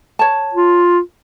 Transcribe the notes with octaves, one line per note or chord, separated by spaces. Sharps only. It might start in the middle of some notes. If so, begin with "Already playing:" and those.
C#5 A5
F4